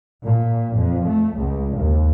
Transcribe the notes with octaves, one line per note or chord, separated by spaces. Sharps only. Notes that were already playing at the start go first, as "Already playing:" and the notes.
A#2
F2
A3
C#2
D#2